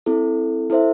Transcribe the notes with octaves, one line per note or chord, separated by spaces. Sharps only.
C4 E4 A4
E4 A4 C5 E5